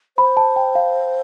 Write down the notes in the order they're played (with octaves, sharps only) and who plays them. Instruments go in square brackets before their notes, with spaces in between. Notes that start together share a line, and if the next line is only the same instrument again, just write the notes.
[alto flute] C5 [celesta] B5
[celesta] A5
G5
F5